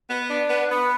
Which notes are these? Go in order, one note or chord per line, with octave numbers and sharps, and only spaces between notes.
B3
D4
B3
B3